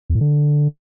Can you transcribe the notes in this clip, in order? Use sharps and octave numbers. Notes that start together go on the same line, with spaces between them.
E2
A2
D3